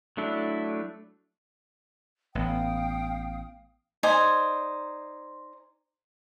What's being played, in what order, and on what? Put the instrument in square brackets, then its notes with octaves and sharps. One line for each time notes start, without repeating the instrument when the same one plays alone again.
[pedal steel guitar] F#3 A3 D4 E4
[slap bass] A1 B3 [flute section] F5 G5 D#6
[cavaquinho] D#4 C5 D5 G#5